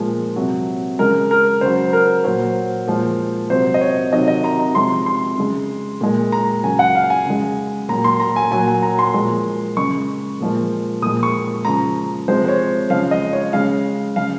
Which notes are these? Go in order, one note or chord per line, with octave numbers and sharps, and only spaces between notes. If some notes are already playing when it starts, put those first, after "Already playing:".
Already playing: A#2 F3 G#3
C3 F#3
C#3 G#3 A#4
A#4
C#3 F#3 C5
A#4
A#2 F#3 C5
A#2 F3 G#3
C3 F#3 C5
D#5
C#5
C3 D#3 F#3 D#5
D#5
A#5
A#5
C3 F3 G#3 C6
C6
C#3 G#3
A#2 G#3
A#5
C#3 F#3 G#5
F#5
F5
G#5
C#3 G#3
A#2 F#3 A#5
C6
A#5
G#5
A#2 F#3 G#5
G#5
A#5
C6
A#2 F3 G#3
C#3 G#3 C#6
A#2 F3 G#3
A#2 F3 G#3 D#6
C#6
C#3 F3 G#3 A#5
C3 F3 G#3 C5
C5
C#5
C#3 F3 G#3 F5
D#5
C#5
C#3 G#3 F5
C#3 G#3 F5